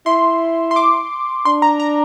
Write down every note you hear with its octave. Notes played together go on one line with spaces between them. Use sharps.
E4 C6
C6
D6
D4 C6
A#5
A#5